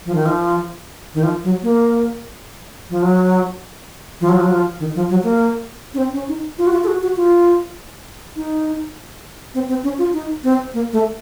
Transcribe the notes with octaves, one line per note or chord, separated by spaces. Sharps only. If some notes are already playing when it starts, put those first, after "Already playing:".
F3
D#3
F3
D#3
F3
F#3
A#3
F3
F#3
F3
F#3
F3
F#3
F3
D#3
F3
F#3
A#3
C#4
C4
C#4
D#4
F4
F#4
F4
A4
F#4
F#4
F4
D#4
C4
C4
C#4
F4
D#4
C4
A#3
A3